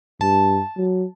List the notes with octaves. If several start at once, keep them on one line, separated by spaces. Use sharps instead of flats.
G2 A5
F#3